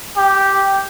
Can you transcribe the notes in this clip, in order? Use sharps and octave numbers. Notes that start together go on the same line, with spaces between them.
G4